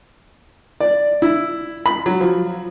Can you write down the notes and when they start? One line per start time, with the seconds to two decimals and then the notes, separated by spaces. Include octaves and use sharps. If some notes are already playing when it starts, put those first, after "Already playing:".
0.80 D5
1.22 E4
1.86 B5
2.06 F#3
2.21 F3